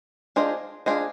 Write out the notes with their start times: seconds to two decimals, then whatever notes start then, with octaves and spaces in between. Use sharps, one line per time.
0.36 D4 F4 G#4 C5 D#5
0.86 D4 F4 G#4 C5 D#5